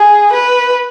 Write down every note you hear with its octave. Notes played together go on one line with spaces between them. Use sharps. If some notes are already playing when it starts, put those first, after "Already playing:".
Already playing: G#4
B4